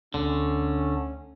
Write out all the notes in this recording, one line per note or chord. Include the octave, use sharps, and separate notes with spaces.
D2 D3 A3 C#4